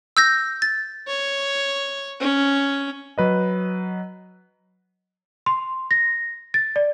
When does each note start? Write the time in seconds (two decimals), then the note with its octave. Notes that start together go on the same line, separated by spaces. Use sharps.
0.17 E6 G6 A#6
0.62 A6
1.07 C#5
2.20 C#4
3.18 F#3 B4 D#5
5.46 C6
5.91 A#6
6.54 A6
6.76 D5